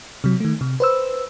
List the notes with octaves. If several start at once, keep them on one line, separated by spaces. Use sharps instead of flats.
C3 F#3
D#3 A3
C3
B4 C5 E6